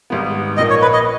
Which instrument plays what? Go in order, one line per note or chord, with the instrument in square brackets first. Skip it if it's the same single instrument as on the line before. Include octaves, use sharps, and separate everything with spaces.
[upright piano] G#1 G#2 G3 B3
[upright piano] A#1 A#2 A#3 [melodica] D#5
[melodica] C#5
B4
D#5